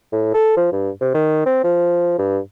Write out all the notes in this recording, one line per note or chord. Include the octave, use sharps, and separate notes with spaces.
A2
A4
F3
G2
C3
D#3
C4
F3
G2